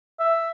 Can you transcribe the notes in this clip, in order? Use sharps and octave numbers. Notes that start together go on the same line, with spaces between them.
E5